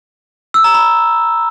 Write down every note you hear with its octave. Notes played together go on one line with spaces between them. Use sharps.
E6
A#5
B5